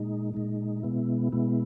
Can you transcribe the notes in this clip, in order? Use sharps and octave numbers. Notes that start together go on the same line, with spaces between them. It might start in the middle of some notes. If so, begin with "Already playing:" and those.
Already playing: A#2 G#3 D#4
A#2 G#3 D#4
B2 G#3 B3 E4
B2 G#3 B3 E4